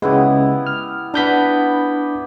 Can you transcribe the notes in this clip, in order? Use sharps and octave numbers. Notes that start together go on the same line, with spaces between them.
C#3 G#3 B3 E4 G4
F6
B3 D4 D5 B5 G6 B6